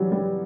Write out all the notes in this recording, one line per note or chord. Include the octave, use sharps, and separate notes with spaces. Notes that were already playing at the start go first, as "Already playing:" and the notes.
Already playing: E3 F#3 G3
G3